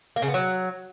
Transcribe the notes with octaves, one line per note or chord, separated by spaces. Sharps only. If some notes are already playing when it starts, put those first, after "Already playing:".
A#3
C#3
B3
F#3